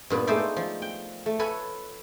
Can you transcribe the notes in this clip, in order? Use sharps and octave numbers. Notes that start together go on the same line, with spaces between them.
G2 A#2 B3
G#3 A3 D#4 C5 D5 E5
F3
G5
A3
A4 B4 C#5 G#5 B5